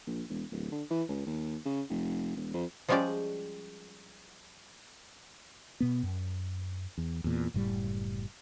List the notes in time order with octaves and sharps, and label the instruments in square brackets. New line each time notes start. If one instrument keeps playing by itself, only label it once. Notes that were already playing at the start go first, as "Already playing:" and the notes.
[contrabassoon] A#1
E1
D1
D3
E3
C#2
D#2
C#3
F1
E1
F2
[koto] F3 G3 G#3 C#4 G4 D5
[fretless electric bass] B2 B3
F#2
E2
E2 A#2
F#1 A2 G3